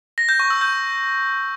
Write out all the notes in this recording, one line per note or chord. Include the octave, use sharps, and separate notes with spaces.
A#6
G6
C#6
E6
G6